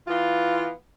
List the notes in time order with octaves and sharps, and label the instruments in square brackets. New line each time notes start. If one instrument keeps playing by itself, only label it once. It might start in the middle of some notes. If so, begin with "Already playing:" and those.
[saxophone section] E3 B3 F4